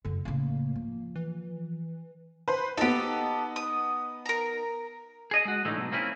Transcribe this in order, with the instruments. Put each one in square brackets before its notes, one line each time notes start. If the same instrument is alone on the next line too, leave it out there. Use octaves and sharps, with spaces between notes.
[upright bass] F#1 B3 [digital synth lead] D3
[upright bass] A2 C#3 [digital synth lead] A#3
[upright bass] F3
[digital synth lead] E3
[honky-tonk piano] B4 C5
[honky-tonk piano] B3 D#4 [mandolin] G4 A4
[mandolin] D#6
A#4 A#5
[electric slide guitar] G#4 D#5
G#3 F#4
A2 D3 E3 A3 D#4 E4
B2 F#3
A#3 C4 C#4 E4 F4 G#4